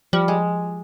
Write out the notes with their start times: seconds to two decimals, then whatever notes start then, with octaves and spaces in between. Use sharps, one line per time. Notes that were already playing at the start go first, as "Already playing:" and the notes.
0.13 F3 G3
0.28 G#3